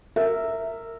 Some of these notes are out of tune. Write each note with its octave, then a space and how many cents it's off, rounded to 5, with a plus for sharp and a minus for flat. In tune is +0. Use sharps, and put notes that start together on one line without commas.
A#4 -20 E5 -5